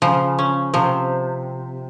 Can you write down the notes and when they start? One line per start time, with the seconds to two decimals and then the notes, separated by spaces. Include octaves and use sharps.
0.02 C#3 F3
0.39 C#4
0.74 C3 F3